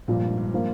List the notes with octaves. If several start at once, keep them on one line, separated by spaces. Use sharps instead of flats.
A#1 G2 A#2 F3
G#2
G2
F3 A#3 F4